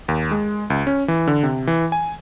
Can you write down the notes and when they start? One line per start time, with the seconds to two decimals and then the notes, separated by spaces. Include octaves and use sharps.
0.08 D#2
0.31 G#3
0.70 C#2
0.87 C#4
1.08 E3
1.27 D3
1.43 C3
1.67 E3
1.92 G#5